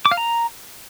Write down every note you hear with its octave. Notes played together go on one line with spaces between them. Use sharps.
D6
F5
A#5